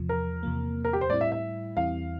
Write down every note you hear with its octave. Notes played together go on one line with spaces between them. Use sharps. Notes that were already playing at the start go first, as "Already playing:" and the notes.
Already playing: E2 C3 F3
A#4
E2 C3 F3 A#3
A#4
G4
C5
A2 G3 C4 E4 D5
E5
E5
E2 E3 G3 C4 E4 F5